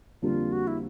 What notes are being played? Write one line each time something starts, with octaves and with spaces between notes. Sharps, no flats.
F2 D3 G3 A#3 F4
F#4
E4